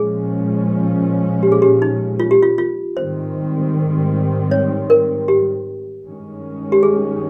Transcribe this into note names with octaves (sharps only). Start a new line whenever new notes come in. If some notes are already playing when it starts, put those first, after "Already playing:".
Already playing: A#2 F3 G#3 C#4 G#4
G4
G#4
G4
D#4
F4
G4
F4
F4
G#2 D#3 G3 C4 C5
C#5
A#4
G4
G2 D#3 G#3 C#4
G4
G#4